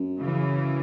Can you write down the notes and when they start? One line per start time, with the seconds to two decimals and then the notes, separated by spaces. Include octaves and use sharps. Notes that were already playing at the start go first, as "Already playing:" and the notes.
Already playing: F#2
0.20 C#3 E3